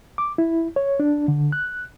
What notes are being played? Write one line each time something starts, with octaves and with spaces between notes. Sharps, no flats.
D6
E4
C#5
D4
D3
F#6